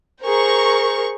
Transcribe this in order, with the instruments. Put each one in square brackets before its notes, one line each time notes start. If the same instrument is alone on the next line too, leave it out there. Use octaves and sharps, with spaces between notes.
[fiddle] G#4 C5 [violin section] A#4 C#6